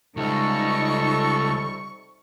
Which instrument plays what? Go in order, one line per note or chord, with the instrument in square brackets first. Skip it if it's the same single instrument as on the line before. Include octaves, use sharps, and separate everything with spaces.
[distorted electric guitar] C#2 [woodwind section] C3 G3 C#6 [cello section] D#4 [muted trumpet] A4